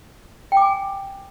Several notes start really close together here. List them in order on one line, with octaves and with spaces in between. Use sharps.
G5 D6 G#5